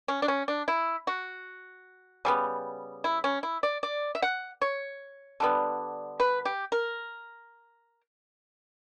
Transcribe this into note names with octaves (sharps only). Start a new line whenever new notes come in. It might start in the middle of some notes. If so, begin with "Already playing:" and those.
C#4
D4
C#4
D4
E4
F#4
C#3 G3 B3
E4
C#4
E4
D5
D5
E5
F#5
C#5
D3 G3 B3
B4
G4
A#4